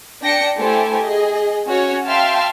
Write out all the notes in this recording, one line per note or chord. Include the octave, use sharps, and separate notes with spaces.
D4 G5 A#6 C#7
A3 E4 G4 A4 C5 G#5
G#4 D#5
C#4 F#4 C#5
E5 F5 G5 A5 C6 F6